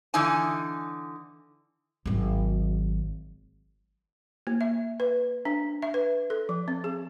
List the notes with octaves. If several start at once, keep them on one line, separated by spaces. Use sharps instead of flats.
D3 E3 D#4 G#5
G#1 F#3
A#3
E5
B4
D4
E5
B4
A4
F3
C4
G#4